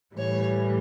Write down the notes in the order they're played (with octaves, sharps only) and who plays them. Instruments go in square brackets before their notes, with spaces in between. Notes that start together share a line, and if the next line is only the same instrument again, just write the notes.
[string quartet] A2 E3 G3 C#5